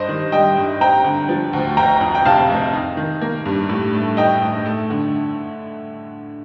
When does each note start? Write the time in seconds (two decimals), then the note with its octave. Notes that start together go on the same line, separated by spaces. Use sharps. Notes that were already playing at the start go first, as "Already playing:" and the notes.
Already playing: G2 C5 D#5
0.09 D#3
0.32 G3 D#5 G5
0.57 G2
0.81 C4 G5 A#5
1.04 D3
1.29 F3
1.53 D2
1.77 F1 G5 A#5
2.01 F2
2.15 G5
2.25 C3 F5 A5
2.50 F1
2.73 D#4
2.97 D#3
3.21 A#3
3.45 G2
3.69 A2
3.94 A3
4.17 D#4 D#5 G5
4.42 A2
4.65 A3
4.90 D3